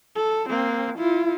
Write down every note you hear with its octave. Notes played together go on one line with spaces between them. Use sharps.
A4
A#3 C4
E4 F4